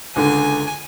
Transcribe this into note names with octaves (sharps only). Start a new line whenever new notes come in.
C#2 D3 G#5